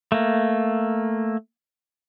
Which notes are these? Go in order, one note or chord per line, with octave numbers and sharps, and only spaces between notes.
A3 A#3